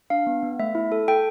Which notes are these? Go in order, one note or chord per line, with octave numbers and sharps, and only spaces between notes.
D4 F5
B3
B3
A3 E5
E4
A4
A4 G5